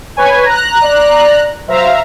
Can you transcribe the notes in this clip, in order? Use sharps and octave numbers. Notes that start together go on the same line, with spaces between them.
B4 C#5 G#5
A#5 F#6
D5
F#3 C5 E5 F5 A#5